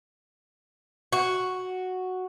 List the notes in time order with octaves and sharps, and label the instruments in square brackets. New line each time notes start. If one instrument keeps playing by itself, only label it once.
[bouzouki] F#4